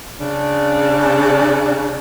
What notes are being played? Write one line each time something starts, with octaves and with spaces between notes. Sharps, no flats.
C#3 D4